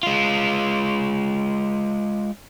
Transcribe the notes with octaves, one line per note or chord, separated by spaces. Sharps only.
G#3 F4